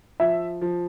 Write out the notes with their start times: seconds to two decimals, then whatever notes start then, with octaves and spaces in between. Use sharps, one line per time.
0.20 F3 E5
0.61 F3